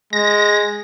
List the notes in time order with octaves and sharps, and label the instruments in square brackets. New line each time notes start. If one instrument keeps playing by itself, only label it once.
[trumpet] G#3 [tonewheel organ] A#6